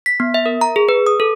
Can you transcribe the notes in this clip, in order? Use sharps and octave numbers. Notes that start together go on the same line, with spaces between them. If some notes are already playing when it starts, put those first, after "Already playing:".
B6
B3
E5
A#4
A#5
G#4
B4
D#6
A4